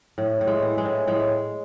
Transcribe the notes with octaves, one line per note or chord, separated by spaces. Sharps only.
A2
A2
G#3
E3
G#3
A2
A2 G#3